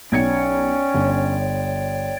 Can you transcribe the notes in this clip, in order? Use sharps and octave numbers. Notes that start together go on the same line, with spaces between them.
B1 C#4 C#5 D5 G5 G#6 C#7
G1